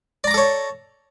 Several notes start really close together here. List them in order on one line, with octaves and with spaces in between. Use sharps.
D5 A#5 D6 A4 C#5